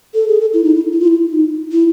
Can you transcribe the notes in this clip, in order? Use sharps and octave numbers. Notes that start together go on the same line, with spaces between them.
A4
G#4
A4
E4
D#4
E4
E4
F4
E4
D#4
E4